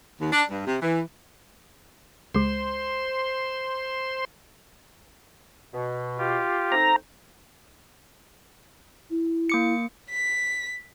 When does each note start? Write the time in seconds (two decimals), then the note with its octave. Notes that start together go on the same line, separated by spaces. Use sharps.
0.20 D#2
0.32 D4
0.50 G2
0.67 C3
0.82 E3
2.35 C#2 G#3 C5 C6
5.73 B2
6.18 F4 G4
6.72 A3 C4 D#4 A#5
9.10 E4
9.49 A#3 D6 C#7
10.11 B6